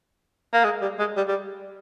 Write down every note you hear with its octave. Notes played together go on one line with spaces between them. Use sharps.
A#3
G#3
G3
G#3
G3
G3